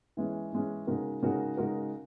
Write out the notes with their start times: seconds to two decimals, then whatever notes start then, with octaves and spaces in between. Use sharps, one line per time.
0.17 E3 G#3 C#4
0.52 E3 G#3 C#4
0.87 C#3 G#3 D#4 F#4 A#4
1.22 C#3 G#3 D#4 F#4 A#4
1.57 C#3 G#3 D#4 F#4 A#4